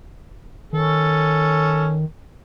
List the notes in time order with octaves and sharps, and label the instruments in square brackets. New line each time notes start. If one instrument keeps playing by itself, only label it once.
[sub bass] D#3 [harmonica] C#4 A4